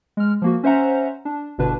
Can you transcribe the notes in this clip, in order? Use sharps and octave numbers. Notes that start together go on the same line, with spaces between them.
G#3 F6
F3 A#3 F#4
C#4 C5 E5 F#5 A#5
D4
G1 B2 D3 D4 B4